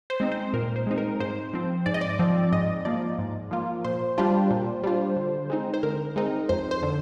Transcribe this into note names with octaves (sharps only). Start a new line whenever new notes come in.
C5
G#3 C4 D#4
C5
A#2 A#4
C5
G#3 C4 D#4
A#4
G#2 C5
F3 C4
G#2 D5
D#5
D5
F3 C4
G#2 D#5
F3 A#3 F4 D5
G#2
F3 A#3 F4
A#2 C5
G3 D4 F4
A#2
G3 D4 F4
D3
G#3 C4 D#4
C5
D3 A#4
G#3 C4 D#4
F2 C5
C5
D3